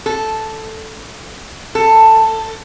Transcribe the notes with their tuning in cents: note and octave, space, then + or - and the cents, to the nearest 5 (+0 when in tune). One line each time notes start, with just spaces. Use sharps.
A4 -5
A4 +10